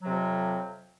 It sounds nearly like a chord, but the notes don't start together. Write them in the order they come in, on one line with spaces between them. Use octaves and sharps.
F#3 C3 F2